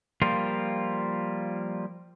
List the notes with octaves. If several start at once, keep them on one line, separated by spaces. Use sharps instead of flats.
F3 G3 A#3 F4